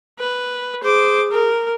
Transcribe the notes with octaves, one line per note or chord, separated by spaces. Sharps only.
B4
G#4 C5 D6
A#4